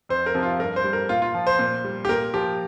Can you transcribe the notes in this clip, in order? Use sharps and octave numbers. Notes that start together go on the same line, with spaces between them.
F2 C5
A#4
C3 F3
F4
G2 A#4
C5
G3
A#4
A#2 F4
F4
F3
C5
A#2
G3
G4
A#2 A#4
F3 G4